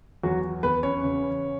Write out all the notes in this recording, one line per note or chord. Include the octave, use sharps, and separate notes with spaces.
E2 F#3 F#4
E2 B3 B4
C#4 C#5
C#3